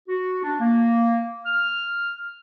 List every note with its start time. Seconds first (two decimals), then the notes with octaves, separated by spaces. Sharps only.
0.08 F#4
0.43 D4
0.60 A#3
1.46 F6